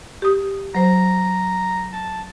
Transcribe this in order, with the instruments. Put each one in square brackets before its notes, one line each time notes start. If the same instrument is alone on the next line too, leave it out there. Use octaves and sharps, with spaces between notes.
[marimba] G4 D#6
[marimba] F#3 C5 [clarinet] A#5
[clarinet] A5